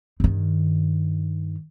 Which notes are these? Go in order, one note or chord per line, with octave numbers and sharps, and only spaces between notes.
G2 D#3